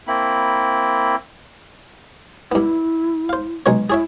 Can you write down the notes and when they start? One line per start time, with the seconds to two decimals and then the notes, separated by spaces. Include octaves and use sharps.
0.07 A#3 C4 E4 B5
2.52 G2 B3 E4
3.29 C5 F5
3.66 B1 G#3 C#5
3.90 E4 G#4 C#5 E5